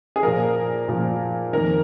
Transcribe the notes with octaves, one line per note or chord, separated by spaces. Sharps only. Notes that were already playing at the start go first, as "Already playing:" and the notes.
G#4
A#2 F3 A#4
A#2 F3
F2 D#3 A#4